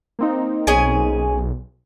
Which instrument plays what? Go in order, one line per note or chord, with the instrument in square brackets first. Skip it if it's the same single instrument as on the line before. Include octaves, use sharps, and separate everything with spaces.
[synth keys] A#3 C4 D#4
[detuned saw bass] B1 [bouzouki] C#4 G#4 G#5